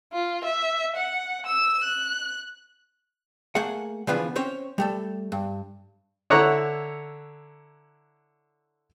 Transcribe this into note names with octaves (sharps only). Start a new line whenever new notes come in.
F4
E5
F#5
E6 E7
F#6
A3 A#3 G#4 F#5
C#3 E3 F3 B3 D4 G#4
C4 C#4 C5 C#5
G3 A3 A4
G2
D3 E4 C#5 F#5 A#5